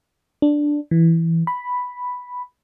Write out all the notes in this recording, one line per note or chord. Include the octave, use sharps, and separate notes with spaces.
D4
E3
B5